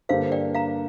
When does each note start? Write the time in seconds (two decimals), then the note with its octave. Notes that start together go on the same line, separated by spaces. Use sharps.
0.09 G2 D3 A#3 G4 C5 F5
0.32 D5 G5
0.54 F5 A#5